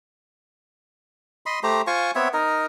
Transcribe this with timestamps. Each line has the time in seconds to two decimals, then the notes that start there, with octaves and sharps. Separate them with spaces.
1.46 D#5 B5 C6
1.63 A3 G4 C5 A#5
1.87 F4 C5 G#5 C#6
2.15 B3 C4 C#5 E5
2.34 D#4 A#4